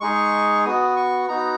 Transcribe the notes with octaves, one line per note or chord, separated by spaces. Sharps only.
G#3 D#4 G#4 C#6
B3 F#4 D#6
C#6
B3 D#4 F#4 A#5